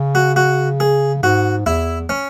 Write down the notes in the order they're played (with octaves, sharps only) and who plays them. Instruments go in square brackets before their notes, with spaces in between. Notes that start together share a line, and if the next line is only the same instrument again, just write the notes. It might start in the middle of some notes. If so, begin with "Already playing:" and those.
Already playing: [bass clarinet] C#3
[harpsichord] F#4
F#4
G#4
[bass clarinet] G#2 [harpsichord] F#4
[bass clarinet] E2 [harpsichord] E4
[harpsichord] C#4